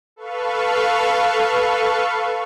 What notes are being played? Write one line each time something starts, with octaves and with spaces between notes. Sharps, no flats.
A4 B4 F5 C#6